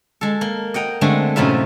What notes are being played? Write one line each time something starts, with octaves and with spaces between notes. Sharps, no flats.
G#3 A4
A#3
D#5 F#5 G5 A#5
D3 G#3 A3 C4
F#2 A2 C3 D#4 F4 E5